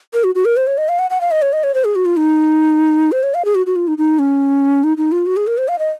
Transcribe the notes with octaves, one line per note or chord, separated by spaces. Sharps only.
A#4
F#4
F#4
A#4
C5
C#5
D#5
F5
F#5
F#5
F5
D#5
C#5
D#5
C#5
C5
G#4
F#4
F4
D#4
C5
C#5
F5
G#4
F#4
F#4
F4
D#4
D#4
C#4
D#4
D#4
F4
F#4
G#4
A#4
C5
F5
D#5